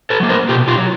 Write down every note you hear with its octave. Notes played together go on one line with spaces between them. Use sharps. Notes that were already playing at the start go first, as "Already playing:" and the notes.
A4 B4
F#3 A#3
A#4 C5
B2 F4 G4
F4 G4
F#3